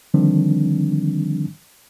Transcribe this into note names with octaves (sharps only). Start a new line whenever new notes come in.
D3 D#3 F3 G3 C4 D4